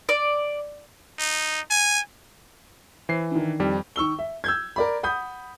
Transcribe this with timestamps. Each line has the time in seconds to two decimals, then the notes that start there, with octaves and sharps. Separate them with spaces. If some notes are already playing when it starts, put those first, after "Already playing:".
0.09 D5
1.19 D#4
1.70 G#5
3.09 E3 C5 C7
3.31 D#3 D4
3.59 F2 G3
3.96 D#3 C#6 E6 G7
4.19 E5
4.44 E6 G6 G#6
4.76 A#4 D5 B5
5.03 F#5 B5 D#6 G6